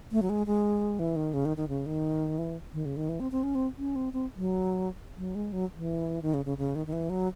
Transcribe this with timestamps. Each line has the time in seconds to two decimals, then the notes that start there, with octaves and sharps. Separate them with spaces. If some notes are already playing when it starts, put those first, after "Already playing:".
0.12 A3
0.22 F#3
0.29 G#3
0.47 G#3
0.99 E3
1.16 D#3
1.34 C#3
1.45 D#3
1.57 D#3
1.69 C#3
1.86 D#3
2.38 E3
2.74 D#3
2.85 C#3
2.97 D#3
3.09 E3
3.20 C4
3.32 C4
3.43 C#4
3.55 C4
3.78 C#4
3.96 C4
4.13 C4
4.36 F#3
5.18 F#3
5.35 G#3
5.52 F#3
5.76 E3
6.22 D#3
6.34 C#3
6.45 C#3
6.58 C#3
6.75 D#3
6.87 D#3
6.93 E3
7.10 F#3